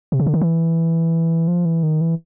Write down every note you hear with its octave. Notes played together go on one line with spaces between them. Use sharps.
C3
C#3
D3
D#3
E3
F3
E3
D#3
E3